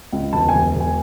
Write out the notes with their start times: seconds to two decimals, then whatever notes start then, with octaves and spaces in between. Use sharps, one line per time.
0.12 C#2
0.33 E1 A5
0.49 G#5
0.54 E1
0.75 E1
0.80 G#5